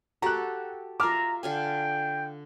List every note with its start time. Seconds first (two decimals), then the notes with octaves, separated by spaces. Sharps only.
0.22 F#4 G4 A4 A#5 F#6
1.00 F4 E5 A#5 D6 F6
1.43 D3 F5 G5 G#5